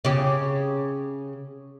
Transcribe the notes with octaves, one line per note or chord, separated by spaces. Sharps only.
C#3 G4